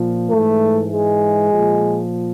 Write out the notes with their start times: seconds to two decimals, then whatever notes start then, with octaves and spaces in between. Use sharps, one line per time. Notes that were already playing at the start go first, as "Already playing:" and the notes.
Already playing: A#2 F3
0.30 G#2 E3 A3
0.92 G#3
1.52 A#2 F3